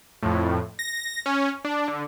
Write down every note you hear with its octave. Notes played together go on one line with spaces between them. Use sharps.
F2 A2
A#6
C#4
D4
D3